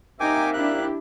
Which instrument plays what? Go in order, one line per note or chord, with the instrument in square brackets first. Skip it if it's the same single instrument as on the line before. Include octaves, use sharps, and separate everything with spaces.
[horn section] C3 A#3 E5 [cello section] D#4 [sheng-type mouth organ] G5 G#5 D6
[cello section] D4 E4 G4 [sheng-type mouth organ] F#6